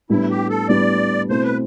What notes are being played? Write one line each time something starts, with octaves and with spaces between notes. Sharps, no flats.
A2 G3 B3 D4 E4
G4
A4
A2 G3 B3 D4 D5
B2 A3 C4 E4 C5
B4